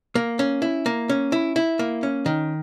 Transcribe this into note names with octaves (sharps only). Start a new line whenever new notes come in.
A#3
C#4
E4
A#3
C#4
E4
E4
A#3
C#4
D#3